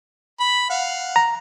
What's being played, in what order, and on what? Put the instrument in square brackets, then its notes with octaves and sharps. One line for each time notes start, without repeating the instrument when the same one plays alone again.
[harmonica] B5
F5 F#5
[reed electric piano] A#5